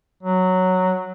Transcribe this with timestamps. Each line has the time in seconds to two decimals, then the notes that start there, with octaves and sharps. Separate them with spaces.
0.23 F#3